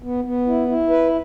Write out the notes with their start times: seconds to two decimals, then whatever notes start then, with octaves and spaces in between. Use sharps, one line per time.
0.03 B3
0.24 B3
0.47 E4
0.68 E4
0.90 B4